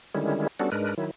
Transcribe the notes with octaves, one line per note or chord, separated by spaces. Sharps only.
D3 D#3 G3 G#3 C#4 E4
G3 B3 C#4 D4 F#4 A4
G#2 G#3 D4 A#4 B4
D#3 F#3 E4